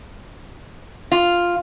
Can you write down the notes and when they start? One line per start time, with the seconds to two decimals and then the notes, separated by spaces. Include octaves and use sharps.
1.12 F4